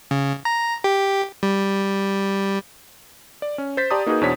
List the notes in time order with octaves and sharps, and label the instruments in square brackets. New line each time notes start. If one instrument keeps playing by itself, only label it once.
[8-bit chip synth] C#3
A#5
G4
G3
[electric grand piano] D5
C#4
C5 G6 A6 B6
G4 D5 A5 A#5 C6 D#6
A#3 D#4 F#4 G#4 B4
E2 B2 D4 C5 C#5 B6